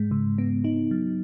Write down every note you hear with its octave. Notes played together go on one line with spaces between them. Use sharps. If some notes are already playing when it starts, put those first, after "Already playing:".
Already playing: G#2 G#3
C#3
B3
D#4
F#3